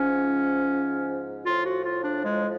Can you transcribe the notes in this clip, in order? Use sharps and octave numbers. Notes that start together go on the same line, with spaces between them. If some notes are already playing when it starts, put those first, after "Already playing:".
Already playing: G#2 F3 C#4
A2 F3 F4
F#4
F4
D4
G#3